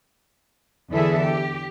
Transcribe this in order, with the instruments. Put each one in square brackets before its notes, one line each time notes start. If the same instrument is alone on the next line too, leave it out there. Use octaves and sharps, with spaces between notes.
[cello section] E2 D3 E3 G#4 A4 E5
G4